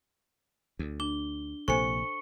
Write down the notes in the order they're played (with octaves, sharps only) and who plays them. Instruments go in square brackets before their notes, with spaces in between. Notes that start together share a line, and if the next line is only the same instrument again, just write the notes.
[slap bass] D2
[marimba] D4 [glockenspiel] G7
[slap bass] A#1 C3 A#3 [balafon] A4 C5 G#5 [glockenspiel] C#6 C#7